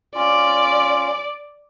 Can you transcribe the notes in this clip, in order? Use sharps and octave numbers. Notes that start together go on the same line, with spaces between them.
C#4 F4 D5